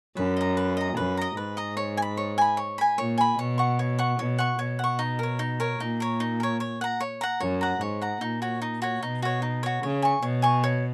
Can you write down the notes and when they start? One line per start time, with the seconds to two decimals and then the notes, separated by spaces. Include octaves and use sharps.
0.16 F#2 B4
0.37 D#5 A#5
0.57 B4
0.77 D#5 A#5
0.96 F#2 B4
1.17 D#5 A#5
1.37 G#2 B4
1.57 D#5 A#5
1.77 C#5
1.97 G#5
2.02 B5
2.17 C#5
2.38 G#5 B5
2.57 C#5
2.78 G#5 B5
2.98 A#2 C#5
3.18 G#5 B5
3.39 B2 C#5
3.58 F#5 C#6
3.79 C#5
3.99 F#5 C#6
4.19 B2 C#5
4.39 F#5 C#6
4.59 B2 C#5
4.79 F#5 C#6
4.99 D#4
5.19 A#4 C#5
5.39 D#4
5.60 A#4 C#5
5.79 A#2 D#4
6.00 A#4 C#5
6.20 D#4
6.40 A#4 C#5
6.60 C#5
6.81 F#5 A#5
7.00 C#5
7.21 F#5 A#5
7.40 F#2 C#5
7.61 F#5 A#5
7.81 G#2 C#5
8.02 F#5 A#5
8.21 A#2 D#4
8.42 F#4 C#5
8.62 D#4
8.82 F#4 C#5
9.02 B2 D#4
9.22 F#4 C#5
9.42 D#4
9.63 F#4 C#5
9.83 C#3 C#5
10.02 G#5 C#6
10.22 B2 C#5
10.42 G#5 C#6
10.64 C#5